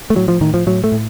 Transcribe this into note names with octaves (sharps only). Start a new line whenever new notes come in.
A3
A2 F#3
F3
A2 D#3
F3
A2 F#3
A3
A2